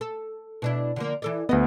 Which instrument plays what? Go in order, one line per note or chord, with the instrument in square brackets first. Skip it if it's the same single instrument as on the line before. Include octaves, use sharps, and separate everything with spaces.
[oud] A4
B2 D4 E4
D3 F3 A#3
E3 A4 D5
[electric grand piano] D2 B3 [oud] B4 D#5